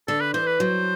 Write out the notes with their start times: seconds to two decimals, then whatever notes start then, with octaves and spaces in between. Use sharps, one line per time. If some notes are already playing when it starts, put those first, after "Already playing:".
0.08 D3 A4
0.21 B4
0.34 E3 C5
0.47 B4
0.59 F#3 C5